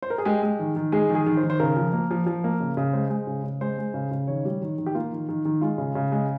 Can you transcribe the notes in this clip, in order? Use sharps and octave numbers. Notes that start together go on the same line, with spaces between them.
C5
A#4
G#4
G#3 G4
G#3
D#3
D#3
G#3 G#4
D#3
G#4
D#3
C5
D#3
C5
C#3 A#4
F3
A#3
F3
F3
A#3
C#3
C#3
G#3 C5
G#3
C#3
C#3
G#3 C5
G#3
C#3
C#3
D#3 C#5
G3
D#3
D#3
G4
A#3 F4
D#3
D#3
D#3
G#3 F4
C#3
C#3
G#3